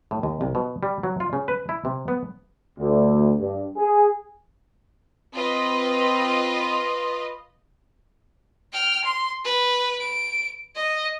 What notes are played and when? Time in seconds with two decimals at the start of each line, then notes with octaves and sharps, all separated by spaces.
0.11 A2
0.23 D#2
0.41 C2
0.55 B2
0.83 G3
1.03 F#3
1.20 F4
1.33 C#3
1.48 B4
1.69 E4
1.85 C3
2.08 B3
2.78 D2
3.38 G2
3.76 G#4
5.35 C4 F4 B4 D#5
8.73 G5 F6
9.04 C6
9.45 B4
10.00 D7
10.76 D#5